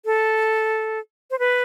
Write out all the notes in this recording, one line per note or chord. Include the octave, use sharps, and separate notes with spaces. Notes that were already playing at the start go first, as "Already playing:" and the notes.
A4
C5
B4